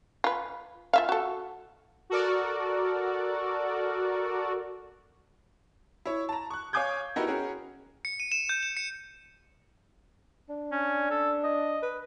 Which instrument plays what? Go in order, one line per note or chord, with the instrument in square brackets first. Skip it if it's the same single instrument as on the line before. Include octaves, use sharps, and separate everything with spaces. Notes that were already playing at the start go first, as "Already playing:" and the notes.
[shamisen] F4 B4
F4 E5 F5
F#4 A4
[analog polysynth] F#4 A4 A#4 D5
[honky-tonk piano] E4 C#5
A5 A#5
C#6 F#6
C#5 F5 G#5 D6 G6 G#6
B3 D#4 E4 F#4 G4 A#4
C#4 F#4 G#4 A#4
[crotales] C#7
D#7
E7
G6
E7
C#7
[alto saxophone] D4
[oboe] C#4
A4
D#5
[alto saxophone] B4